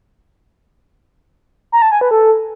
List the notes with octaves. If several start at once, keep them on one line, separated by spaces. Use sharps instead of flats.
A#5
A5
G#5
B4
A4